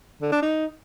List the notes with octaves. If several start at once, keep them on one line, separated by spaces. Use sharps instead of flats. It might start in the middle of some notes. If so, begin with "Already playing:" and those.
D3
D4
D#4